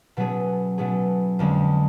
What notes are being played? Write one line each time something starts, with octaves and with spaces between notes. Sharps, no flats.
B2 F#3 A3 C#4 G#4
B2 F#3 A3 C#4 G#4
F2 D3 G#3 C#4